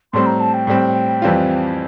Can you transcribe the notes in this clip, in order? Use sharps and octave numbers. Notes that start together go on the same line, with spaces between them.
A2 G3 C4 C6
A#5
A5
G5
A2 G3 C4
F2 E3 G3 C4 F4